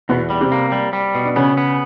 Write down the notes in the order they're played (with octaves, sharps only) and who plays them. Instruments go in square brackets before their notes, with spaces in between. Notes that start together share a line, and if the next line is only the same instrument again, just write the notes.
[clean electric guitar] E2 [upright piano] B2 B3
[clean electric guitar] G3
[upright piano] C3 C4
[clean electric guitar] A#3
G3
G3
B2
[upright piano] D4
[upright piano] C#3 C#4 [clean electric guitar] B3
[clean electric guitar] B3